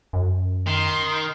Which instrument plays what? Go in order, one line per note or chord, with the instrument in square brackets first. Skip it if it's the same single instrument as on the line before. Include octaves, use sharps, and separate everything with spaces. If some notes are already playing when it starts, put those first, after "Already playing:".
[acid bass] F#2
[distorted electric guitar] D#3 [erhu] C6